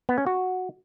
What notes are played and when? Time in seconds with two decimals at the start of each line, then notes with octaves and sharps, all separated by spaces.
0.09 B3
0.18 C#4
0.27 F#4